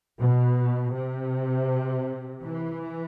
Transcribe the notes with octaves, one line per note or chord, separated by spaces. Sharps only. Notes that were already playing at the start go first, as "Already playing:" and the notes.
B2
C3
E3